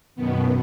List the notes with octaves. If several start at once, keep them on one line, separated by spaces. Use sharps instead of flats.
F#2 B2 D#3 B3